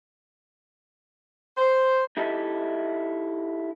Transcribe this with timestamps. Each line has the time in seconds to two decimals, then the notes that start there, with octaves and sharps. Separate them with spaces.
1.57 C5
2.17 D#4 E4 G4 A4 D#5 E5